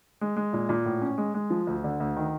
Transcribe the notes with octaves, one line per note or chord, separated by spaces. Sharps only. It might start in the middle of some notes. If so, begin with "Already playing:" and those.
G#3
G#3
A#2
A#2
A2
C#4
G#3
G#3
F3
D2
D3
D2
D#3